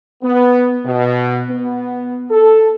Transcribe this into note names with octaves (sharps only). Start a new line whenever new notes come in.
B3
B2
B3
A4